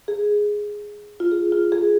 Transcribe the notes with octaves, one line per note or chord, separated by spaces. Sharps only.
G#4
F4
G#4
F4
G#4